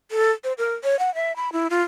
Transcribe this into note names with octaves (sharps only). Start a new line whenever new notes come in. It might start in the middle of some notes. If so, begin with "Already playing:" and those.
A4
C5
A#4
C#5
F#5
E5
B5
E4
F4